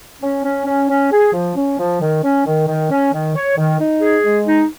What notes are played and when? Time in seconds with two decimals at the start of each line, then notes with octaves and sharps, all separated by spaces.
0.21 C#4
0.44 C#4
0.66 C#4
0.89 C#4
1.11 G#4
1.33 F3
1.55 C#4
1.78 F3
2.01 D#3
2.23 C#4
2.45 D#3
2.67 D#3
2.90 C#4
3.12 D#3
3.35 C#5
3.57 D#3
3.79 D#4
4.01 G#4
4.24 G#3
4.46 D#4